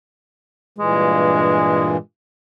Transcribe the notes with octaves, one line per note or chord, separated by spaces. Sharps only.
G2 A#2 E3 G#3